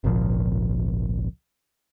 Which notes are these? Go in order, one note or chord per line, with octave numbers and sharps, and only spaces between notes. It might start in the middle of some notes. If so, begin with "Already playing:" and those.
G#1 C#2 A#2 F3